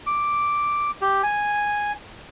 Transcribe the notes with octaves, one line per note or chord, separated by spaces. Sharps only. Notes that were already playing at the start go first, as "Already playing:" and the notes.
D6
G4
G#5